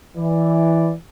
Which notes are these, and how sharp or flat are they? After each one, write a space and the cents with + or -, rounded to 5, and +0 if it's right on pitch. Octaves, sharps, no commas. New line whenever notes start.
E3 +0 D5 +0